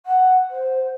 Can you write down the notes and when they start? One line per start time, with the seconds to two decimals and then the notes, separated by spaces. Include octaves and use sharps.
0.06 F#5
0.50 C5